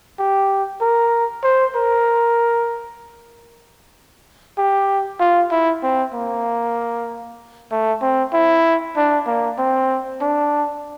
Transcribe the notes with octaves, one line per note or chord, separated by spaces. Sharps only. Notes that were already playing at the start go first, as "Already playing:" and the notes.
G4
A#4
C5
A#4
G4
F4
E4
C4
A#3
A3
C4
E4
D4
A#3
C4
D4